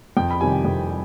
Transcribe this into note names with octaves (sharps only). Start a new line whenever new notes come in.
F2 G5
B5
C3 D#3 G3 G#5
F2
G3